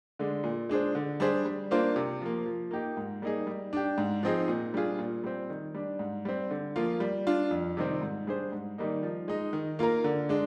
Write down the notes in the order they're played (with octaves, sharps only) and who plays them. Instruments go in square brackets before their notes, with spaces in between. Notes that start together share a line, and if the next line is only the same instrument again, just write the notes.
[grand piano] D3 G#3 D4
A#2
G#3 D4 G#4 C5
D3
G3 D4 G#4 C5
G3
A#3 D4 F4 C5
C3
F3 A#3
F3
A#3 D#4 G4
G#2
G3 A#3 D#4 G#4
G3
D4 G4
G#2
F3 C4 D#4 G#4
A#2
G3 D4 F4 G#4
A#2
G3 C4
D#3
G3 D4
G#2
G3 C4
D3
F3 A#3 F4
G3
D4 F4
F2
C3 D#3 G3 C4
G#2
G3 D4 G#4 C5
G#2
D#3 G3 A#3 D#4
F3
G#3 D#4
D#3
A#3 F4 A#4
D3
G#3 D4